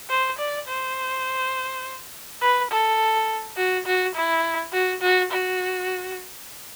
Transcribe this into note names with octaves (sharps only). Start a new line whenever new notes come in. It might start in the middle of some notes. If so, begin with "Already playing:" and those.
C5
D5
C5
B4
A4
F#4
F#4
E4
F#4
F#4
F#4